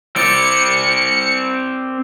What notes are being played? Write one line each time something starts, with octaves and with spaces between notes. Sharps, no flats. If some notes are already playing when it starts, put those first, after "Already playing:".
C4 D5 C#7